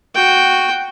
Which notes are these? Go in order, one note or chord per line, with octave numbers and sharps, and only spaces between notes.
F#4 G5